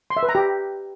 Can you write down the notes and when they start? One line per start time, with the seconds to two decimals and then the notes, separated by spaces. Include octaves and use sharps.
0.10 C6
0.17 E5
0.23 B4
0.29 A#5
0.35 G4